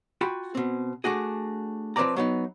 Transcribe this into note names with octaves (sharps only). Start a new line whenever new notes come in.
F4 F#4 G5 B5
B2 C4
A3 D4 F#4 G#4
F3 C4 B4 C#5 D5 A#5
F#3 B3 D#4